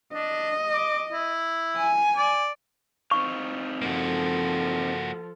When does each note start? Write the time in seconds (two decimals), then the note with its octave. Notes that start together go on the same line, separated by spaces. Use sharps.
0.13 D4 D#5
0.73 D6
1.12 E4
1.77 G#5
2.16 D5
3.11 C4 D#4 F5 C#6
3.82 F3 A#3 F#4 A4